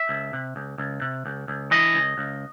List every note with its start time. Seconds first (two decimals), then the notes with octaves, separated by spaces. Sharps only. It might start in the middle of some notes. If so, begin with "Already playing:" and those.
Already playing: E5
0.09 C#2
0.33 C3
0.56 C#2
0.78 C#2
1.01 C3
1.26 C#2
1.48 C#2
1.71 E3 D#5
1.94 C#2
2.18 C#2